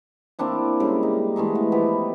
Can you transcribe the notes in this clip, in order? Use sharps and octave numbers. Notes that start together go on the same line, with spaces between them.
A#3 C4 D4 E4
C#3 G3 G#3
D#4
E3 G#3 A3 D#4
B3
F3 B3 G4 B4